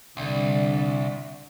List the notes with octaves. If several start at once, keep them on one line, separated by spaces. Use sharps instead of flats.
C2 D3 D5